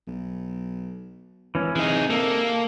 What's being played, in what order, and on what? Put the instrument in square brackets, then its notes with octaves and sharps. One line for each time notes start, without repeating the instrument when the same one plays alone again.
[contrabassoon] B1
[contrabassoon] G#1 [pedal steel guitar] E3 C#4
[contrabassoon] C3 [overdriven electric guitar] E3 D#4 [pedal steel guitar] G#4
[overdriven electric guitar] A#3 [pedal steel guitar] A4